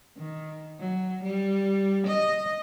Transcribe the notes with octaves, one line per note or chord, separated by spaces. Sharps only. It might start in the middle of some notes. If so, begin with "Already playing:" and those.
D#3
F#3
G3
D#5